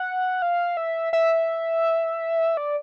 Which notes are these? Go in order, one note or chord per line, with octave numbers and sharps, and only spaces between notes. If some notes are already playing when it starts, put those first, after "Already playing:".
Already playing: F#5
F5
E5
E5
D5